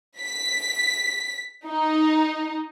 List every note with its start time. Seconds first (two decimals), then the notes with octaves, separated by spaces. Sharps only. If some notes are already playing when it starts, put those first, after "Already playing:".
0.19 B6
1.66 D#4